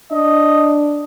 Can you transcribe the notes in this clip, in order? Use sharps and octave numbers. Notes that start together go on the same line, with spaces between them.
D4 D#5